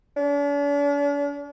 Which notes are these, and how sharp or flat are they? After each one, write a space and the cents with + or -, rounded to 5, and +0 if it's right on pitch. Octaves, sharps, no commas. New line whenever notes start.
D4 -45